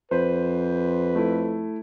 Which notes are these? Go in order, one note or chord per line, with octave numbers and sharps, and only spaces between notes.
F2 B4 C5
A3 E4